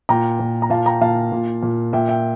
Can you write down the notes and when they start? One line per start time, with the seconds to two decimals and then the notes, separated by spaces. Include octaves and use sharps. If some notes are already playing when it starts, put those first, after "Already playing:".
0.09 A#2 G5 A#5
0.40 A#2
0.62 A#5
0.70 A#2 F5 A5
0.86 G5 A#5
1.01 A#2 F5 A5
1.32 A#2
1.63 A#2
1.93 A#2 E5 G5
2.08 E5 G5